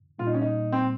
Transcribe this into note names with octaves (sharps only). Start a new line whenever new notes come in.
A#2 G3 A#3 F4
D#4
C#4
D#4
C4